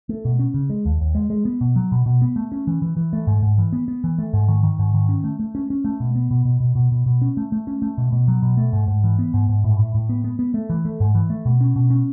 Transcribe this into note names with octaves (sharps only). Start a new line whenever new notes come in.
A3
B2
C#4
C#3
G#3
D#2
D#2
G#3
G#3
B3
B2
F#3
B2
B2
B3
A3
C#4
E3
E3
E3
A3
G#2
G#2
E3
B3
B3
E3
A3
G#2
D#3
D#3
G#2
D#3
C#4
A3
A3
C#4
C#4
A3
B2
B3
B2
B2
B2
B2
B2
B2
C#4
A3
A3
C#4
A3
B2
B2
F#3
B2
A3
G#2
G#2
E3
B3
G#2
G#2
A2
A2
A2
B3
B3
B3
A3
E3
A3
G#2
E3
A3
B2
C#4
B2
C#4